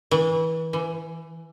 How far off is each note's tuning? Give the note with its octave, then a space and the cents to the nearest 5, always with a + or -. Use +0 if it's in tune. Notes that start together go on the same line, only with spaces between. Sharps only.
E3 -30
E3 +20